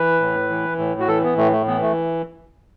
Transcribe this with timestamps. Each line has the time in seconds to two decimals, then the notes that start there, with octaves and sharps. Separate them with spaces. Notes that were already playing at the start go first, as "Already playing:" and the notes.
Already playing: E3 B4
0.21 A2
0.50 E3
0.78 A2
1.00 F#4
1.08 E3 A4
1.24 B3
1.37 A2 A3
1.52 A3
1.67 E3 B3
1.82 A3